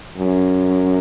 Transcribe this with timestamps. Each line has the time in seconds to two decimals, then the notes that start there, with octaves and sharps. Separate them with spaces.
0.18 F#2